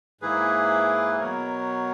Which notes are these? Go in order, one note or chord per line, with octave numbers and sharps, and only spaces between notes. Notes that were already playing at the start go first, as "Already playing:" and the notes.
G#2 E3 A#3 E4 G#4 B4
B2 F#3 B3 A#4 C#5